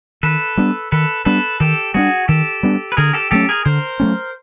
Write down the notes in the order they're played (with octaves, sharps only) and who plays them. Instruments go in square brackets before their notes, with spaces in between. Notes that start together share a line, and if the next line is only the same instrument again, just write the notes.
[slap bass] D#3 [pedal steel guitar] A4 B4
[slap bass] G3 B3 D4
[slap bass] D#3 [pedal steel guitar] A4 B4
[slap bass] G3 B3 D4 [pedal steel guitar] A4 B4
[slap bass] D#3 [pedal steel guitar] G4 A4
[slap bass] G3 B3 D4 [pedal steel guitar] F#4 G#4
[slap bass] D#3 [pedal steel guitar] G4 A4
[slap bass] G3 B3 D4
[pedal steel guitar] B4
[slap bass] D3 [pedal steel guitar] G#4 A#4
[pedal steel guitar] G4 A4
[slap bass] F#3 A3 C#4 [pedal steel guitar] G4 A4
[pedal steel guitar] G#4 A#4
[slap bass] D3 [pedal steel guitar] A#4 C5
[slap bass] F#3 A3 C#4